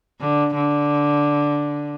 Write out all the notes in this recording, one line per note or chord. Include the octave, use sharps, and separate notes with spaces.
D3
D3